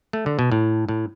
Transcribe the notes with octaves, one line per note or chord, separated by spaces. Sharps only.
A3
D3
B2
A2
A2